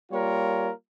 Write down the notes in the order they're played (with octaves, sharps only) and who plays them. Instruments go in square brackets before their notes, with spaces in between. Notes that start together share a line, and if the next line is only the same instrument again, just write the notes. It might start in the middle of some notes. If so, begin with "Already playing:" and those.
[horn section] G3 A#3 F4 A#4 C#5